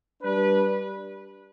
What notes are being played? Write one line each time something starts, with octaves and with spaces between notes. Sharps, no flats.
G3 D4 B4